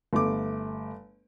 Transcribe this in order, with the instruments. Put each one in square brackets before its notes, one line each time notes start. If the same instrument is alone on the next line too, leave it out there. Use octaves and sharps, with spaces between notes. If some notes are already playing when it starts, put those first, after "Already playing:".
[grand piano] G1 A3 D6